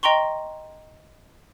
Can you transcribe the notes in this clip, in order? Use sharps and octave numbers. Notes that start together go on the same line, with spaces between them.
D#5 G5 A#5 C6 C#6